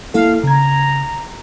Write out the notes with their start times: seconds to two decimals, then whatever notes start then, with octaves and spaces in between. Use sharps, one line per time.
0.14 A#3 E4 A4 F5
0.44 C#3 A#5 G#6